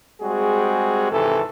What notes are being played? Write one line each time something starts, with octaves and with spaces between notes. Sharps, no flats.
G3 G#3 C4 F#4 G#4
G#1 C3 E3 A4